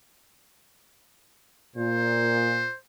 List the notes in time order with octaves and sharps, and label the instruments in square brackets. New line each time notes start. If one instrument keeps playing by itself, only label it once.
[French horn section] A#2 [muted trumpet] C5